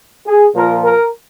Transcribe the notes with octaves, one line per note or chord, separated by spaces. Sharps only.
G#4
A#2 F3 A#4
A#4